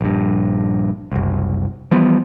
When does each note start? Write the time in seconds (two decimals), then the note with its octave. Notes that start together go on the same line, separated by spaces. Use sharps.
0.01 A#1 G2
1.12 F#1 C2
1.91 E3 F3 G3 B3